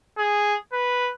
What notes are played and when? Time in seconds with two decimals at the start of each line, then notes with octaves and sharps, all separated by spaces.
0.18 G#4
0.73 B4